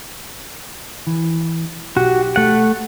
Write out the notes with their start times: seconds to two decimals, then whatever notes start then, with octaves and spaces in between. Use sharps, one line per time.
1.07 E3
1.97 B1 F#4 G4
2.36 A3 F#5